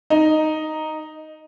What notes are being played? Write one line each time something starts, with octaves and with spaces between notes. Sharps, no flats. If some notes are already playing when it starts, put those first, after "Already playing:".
D#4